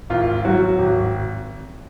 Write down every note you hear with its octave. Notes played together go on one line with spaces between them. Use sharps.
G#1 F4
F#3 F#4
G#1